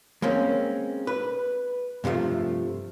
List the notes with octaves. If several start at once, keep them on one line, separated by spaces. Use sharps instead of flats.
G#3 A#3 C4 C#4
B4
G2 C3 F3 G#3 A3